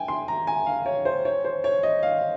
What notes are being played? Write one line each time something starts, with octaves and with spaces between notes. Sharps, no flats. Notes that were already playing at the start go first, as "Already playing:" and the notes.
Already playing: G5 G#5
C6
A#5
G#5
F5
C#5
C5
C#5
C5
C#5
D#5
F5